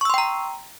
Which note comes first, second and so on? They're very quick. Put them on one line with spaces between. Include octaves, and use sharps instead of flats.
C#6 E6 C6 G5 A#5